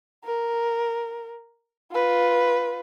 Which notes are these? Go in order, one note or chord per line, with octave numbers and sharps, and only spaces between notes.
A#4
F4 B4